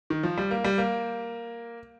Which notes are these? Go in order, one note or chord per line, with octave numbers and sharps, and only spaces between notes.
D#3
F3
G3
A#3
G3
A#3